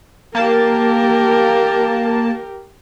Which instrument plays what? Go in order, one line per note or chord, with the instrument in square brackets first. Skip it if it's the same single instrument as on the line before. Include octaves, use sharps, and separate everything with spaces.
[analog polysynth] A#3 A5 [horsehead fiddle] G4 A#4